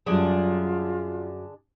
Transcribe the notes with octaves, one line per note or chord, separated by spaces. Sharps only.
F#2 D3 F#3 G3 D4 F4 G#4